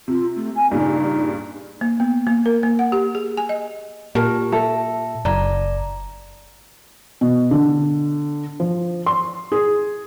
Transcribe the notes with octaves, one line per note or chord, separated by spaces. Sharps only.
C3 F4
A3
G#5
G2 A#2 C#3 D#4
A#3
B3
A#3
A#4
A#3
F#5
G4
G#4
G#5
D#5
A#2 G4 A#4 A5
A4 E5
F#1 D5 A#5
B2
D3
F3
C6
G#4